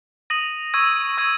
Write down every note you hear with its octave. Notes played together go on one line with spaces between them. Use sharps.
D#6 A#6 D#7 F#7
C#6 E6 G#6 D#7
C#6 E6 G#6 D#7